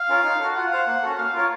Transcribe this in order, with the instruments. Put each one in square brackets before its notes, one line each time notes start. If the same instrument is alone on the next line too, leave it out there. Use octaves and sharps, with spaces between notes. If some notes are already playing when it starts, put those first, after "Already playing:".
Already playing: [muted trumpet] F5
[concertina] C#4 F4 A#4 C#5
D#4
F#4 A4
[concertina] F4 [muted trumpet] F#5
[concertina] C5 F5
A#3
C#4 F#4 A4
[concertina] A#3 [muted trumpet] F5
[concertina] F4 A#4 C#5